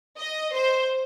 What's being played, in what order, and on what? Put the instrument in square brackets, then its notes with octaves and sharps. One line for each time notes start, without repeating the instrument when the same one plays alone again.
[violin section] D#5
C5